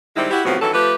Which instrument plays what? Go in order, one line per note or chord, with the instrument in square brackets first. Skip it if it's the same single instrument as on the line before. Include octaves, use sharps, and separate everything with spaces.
[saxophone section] D#3 G3 G#3 C4 D#4 E4
E4 F#4 G4
A2 C3 F3 F#3 B3
D#3 E3 F#3 C#4 A4
F3 A3 G4 B4